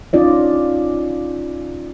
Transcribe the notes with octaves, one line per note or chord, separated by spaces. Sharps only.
C#4 D#4 F4 D5 D#5